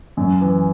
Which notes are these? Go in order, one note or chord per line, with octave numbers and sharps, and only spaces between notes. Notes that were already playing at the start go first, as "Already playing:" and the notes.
F#2
E3